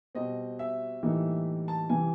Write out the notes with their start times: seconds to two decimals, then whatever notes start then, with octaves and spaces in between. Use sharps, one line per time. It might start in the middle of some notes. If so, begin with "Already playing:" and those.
0.15 B2 G3 C4 D#5
0.59 E5
1.03 A2 E3 G3 A#3 D#4
1.68 A5
1.89 C3 E3 G3 G#5